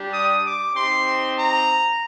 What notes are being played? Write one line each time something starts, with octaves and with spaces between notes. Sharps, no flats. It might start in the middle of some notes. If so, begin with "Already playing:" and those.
Already playing: G3 D4 G4
D#6
D6
C4 D#4 G4 C6
A#5